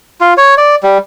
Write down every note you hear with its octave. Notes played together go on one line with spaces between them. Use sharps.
F4
C#5
D5
G3